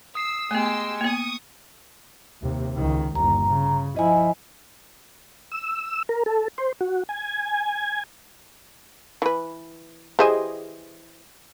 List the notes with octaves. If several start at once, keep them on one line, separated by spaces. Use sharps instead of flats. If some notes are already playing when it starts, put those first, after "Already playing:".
D#6 E6 C7
G#3 A3 B3 G4 G#5 C6 E6
A#3 B3 C#6 D#6
D#2 C3
C#2 D#3
G1 D#2 A#5
C#3
F3 E4 D#5 G#5
E6
A#4
A4
C5
F#4
G#5
E3 B4
E3 G4 G#4 C5 D#5 G#5